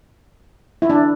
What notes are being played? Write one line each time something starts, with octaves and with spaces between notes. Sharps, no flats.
E4
D4